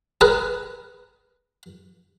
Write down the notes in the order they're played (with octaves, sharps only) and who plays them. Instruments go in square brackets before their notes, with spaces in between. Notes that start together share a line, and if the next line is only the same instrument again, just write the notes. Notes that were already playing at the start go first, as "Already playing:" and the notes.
[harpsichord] G#4 A#4 B4